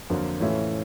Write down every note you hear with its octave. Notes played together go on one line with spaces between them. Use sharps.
F2 D3 F#3 A#3
A2 E3 A3 C#4 F4